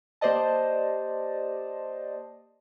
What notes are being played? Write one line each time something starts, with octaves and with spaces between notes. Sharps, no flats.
A#3 G4 C5 D5 D#5 A5